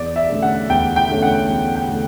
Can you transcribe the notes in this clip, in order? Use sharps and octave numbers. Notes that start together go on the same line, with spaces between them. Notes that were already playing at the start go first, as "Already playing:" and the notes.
Already playing: E2 D5
E5
D3 A3 C#4
F#5
E2 G5
G5
D3 A3 C#4
F#5
E2
G5
D3 A3